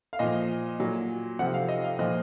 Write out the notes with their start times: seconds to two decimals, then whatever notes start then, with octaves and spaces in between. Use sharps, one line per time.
0.13 F5
0.19 A#2 F3 D#5
0.80 A#2 F#3
1.39 C3 F3 F#5
1.54 F5
1.68 D#5
1.84 F5
1.99 A#2 F3 D#5